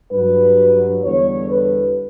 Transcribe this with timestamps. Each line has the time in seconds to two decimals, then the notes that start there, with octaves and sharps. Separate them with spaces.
0.12 G2 F#3 B4
1.04 E2 D3 G3 C#5
1.50 B4